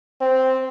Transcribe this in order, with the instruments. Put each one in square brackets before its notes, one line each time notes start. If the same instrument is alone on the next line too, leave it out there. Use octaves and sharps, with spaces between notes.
[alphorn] C4